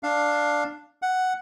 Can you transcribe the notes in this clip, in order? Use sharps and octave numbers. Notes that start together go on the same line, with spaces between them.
D4 F5
F#5